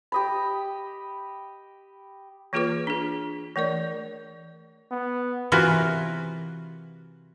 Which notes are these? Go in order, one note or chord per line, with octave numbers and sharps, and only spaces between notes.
G4 D#5 B5
E3 A#3 F4 G#4 B4 D6
D4 G#4
E3 A3 A#4 D5
B3
C3 E3 F4 F#4 A#4 B4